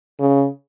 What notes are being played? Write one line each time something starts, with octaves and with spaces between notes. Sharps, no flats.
C#3